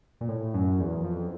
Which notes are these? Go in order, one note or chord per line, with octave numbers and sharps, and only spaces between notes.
A#2
A2
F#2
E2
F2